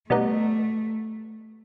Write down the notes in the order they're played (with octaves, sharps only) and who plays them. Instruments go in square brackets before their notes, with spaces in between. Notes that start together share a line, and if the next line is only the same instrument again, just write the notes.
[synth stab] B2 G3 B3 D#4 [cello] A3